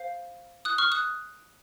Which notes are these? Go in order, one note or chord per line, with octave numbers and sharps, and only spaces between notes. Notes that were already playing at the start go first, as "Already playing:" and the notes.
Already playing: C5 F5
D#6 F#6
C#6 F6
D#6 F#6